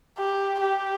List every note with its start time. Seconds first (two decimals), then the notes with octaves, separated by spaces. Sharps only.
0.19 G4
0.60 G4